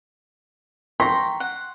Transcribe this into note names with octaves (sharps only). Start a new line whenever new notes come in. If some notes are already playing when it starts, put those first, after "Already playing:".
G5 A#5 C6 C#6 B6
F#5